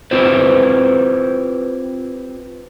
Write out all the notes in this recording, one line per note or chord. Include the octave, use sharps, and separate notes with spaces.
C4 E4 F4 G4 B4 C5